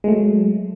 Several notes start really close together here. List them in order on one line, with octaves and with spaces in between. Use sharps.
G#3 A3 F#3